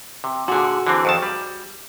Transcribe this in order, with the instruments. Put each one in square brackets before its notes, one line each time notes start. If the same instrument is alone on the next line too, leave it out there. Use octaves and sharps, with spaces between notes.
[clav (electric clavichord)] C3
[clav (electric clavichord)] A#2 D3 [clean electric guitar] F#4 G#4
[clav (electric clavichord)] D3 E3 C4
F2 D#3 A5
G3